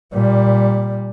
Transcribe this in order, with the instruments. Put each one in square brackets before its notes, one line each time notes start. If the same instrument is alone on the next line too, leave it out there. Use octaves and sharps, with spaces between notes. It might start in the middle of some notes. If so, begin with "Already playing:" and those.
[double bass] A#2 G3